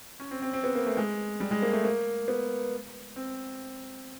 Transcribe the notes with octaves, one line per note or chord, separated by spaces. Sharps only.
C#4
C4
C4
C4
B3
A#3
A3
G#3
G3
G#3
A#3
A3
A#3
B3
C4